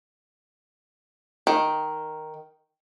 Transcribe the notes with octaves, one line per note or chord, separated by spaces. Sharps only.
D#3